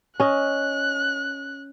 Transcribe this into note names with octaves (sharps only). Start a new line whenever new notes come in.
C#4 D#5 F#6